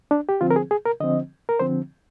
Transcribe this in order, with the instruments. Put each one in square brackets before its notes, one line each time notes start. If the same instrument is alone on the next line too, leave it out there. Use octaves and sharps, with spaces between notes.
[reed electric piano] D4
G4
D3 F3 C4 F4
A#4
G#4
G#4
A#4
D3 F3 C4 D#5
A#4
D3 F3 C4 C5